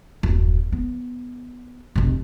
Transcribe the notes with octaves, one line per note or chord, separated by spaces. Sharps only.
D#1 F#2
B3
F1 B1